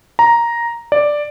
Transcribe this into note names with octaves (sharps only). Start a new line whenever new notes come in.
A#5
D5